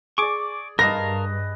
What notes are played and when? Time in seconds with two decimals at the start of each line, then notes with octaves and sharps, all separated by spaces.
0.18 G#4 D5 C#6 D6
0.79 G2 A#4 B4 D#5 F5 A5 A#6